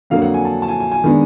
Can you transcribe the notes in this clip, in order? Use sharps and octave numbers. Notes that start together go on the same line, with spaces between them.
F2 D3 F#3 A#3 F5
F#5
G#5
A5
A5
G#5
G#5
G#5
D#3 G#3 B3 D4